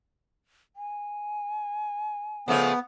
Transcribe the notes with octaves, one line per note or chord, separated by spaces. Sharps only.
G#5
C#3 F3 A3 B3